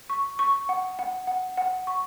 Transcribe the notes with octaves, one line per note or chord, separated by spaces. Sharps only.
C#6
C#6
F#5
F#5
F#5
F#5
C#6